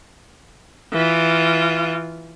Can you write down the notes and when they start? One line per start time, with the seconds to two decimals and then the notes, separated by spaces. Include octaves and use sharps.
0.93 E3 F4